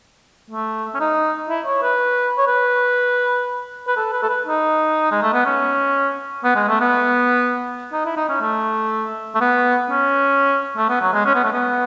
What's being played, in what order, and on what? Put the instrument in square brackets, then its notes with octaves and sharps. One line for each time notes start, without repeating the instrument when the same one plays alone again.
[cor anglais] A3
C#4
D#4
E4
C#5
B4
C#5
B4
B4
A4
B4
A4
B4
D#4
G#3
A3
B3
C#4
B3
G#3
A3
B3
D#4
E4
D#4
C#4
A3
A3
B3
C#4
A3
B3
F#3
G#3
C#4
B3
A3
B3